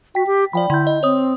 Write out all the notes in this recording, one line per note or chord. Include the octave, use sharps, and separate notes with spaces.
F#4 G5 B6
G4
F3 D5 G5 B5
D3 E4 G6
D#5
C4 C#5 D#6